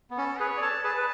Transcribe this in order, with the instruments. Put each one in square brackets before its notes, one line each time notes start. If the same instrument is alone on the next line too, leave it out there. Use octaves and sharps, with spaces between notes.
[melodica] B3
[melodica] C#4 [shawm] A4
[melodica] G#4 B4 [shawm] C#5
[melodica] D5
[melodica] A4 C#5 [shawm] A5
[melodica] G#4 B4 [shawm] A5
[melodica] B4